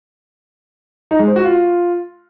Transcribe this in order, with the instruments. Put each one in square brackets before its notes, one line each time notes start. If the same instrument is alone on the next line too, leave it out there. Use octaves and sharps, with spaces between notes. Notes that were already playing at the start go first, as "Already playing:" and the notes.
[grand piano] D#4
G#3
C5
F#4
F4